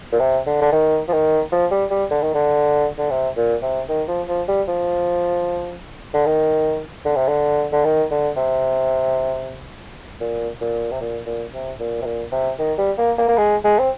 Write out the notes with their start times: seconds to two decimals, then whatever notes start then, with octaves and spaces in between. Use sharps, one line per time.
0.13 A#2
0.19 C3
0.46 D3
0.61 D3
0.72 D#3
1.08 F3
1.12 D#3
1.52 F3
1.71 G3
1.91 G3
2.11 D3
2.22 D#3
2.34 D3
2.98 D3
3.10 C3
3.37 A#2
3.62 C3
3.89 D#3
4.08 F3
4.28 F3
4.48 G3
4.68 F3
6.14 D3
6.26 D#3
7.05 D3
7.16 C3
7.28 D3
7.73 D3
7.85 D#3
8.11 D3
8.36 C3
10.21 A#2
10.61 A#2
10.92 C3
11.01 A#2
11.26 A#2
11.53 C3
11.79 A#2
12.02 C3
12.05 A#2
12.32 C3
12.59 D#3
12.78 G3
12.98 A#3
13.18 A#3
13.28 A#3
13.38 G#3
13.64 G#3
13.79 C4